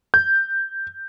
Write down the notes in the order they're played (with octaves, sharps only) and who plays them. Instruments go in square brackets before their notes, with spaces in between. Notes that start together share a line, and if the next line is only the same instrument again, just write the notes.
[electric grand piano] G6